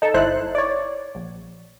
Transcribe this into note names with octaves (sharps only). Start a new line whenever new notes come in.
D#4 A4
G1 D#4 E4 C5 F#6
C#5 D5
A#1